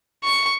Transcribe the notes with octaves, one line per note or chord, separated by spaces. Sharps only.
C#6